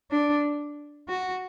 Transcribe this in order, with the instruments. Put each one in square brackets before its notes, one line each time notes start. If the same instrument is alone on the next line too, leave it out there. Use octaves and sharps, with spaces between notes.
[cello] D4
F#4